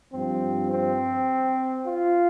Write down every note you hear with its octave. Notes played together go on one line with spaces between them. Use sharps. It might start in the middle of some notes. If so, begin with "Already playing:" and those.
G2 F3 C4
C4
F4